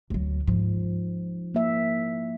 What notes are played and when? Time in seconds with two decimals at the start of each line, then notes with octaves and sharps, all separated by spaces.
0.10 D2 F#3
0.47 G#2 F3
1.54 A#3 E5